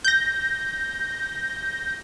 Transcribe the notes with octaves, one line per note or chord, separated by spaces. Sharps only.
G6 A#6